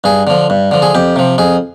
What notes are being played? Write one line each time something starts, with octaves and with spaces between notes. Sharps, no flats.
G2 G#4
D3 F3
G2
D3 F3
G#4
F2 G4
C3 F3
F2 G#4